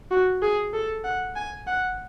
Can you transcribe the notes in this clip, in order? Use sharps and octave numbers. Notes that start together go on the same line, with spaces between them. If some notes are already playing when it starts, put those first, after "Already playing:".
F#4
G#4
A4
F#5
G#5
F#5